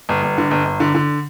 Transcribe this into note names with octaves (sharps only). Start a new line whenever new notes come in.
G1
G1
D3
G1
G1
D3
D3